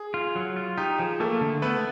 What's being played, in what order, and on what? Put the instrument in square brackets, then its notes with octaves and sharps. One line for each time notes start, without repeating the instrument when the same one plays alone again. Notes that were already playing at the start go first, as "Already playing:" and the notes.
Already playing: [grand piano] G#4
[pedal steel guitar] F4
F#3
F4
[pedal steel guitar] D#4 [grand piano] G4
[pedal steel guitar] F3 [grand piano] G#4
[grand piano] A3 A4 [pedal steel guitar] A#3
[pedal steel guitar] D3
[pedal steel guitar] A3 [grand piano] B3 B4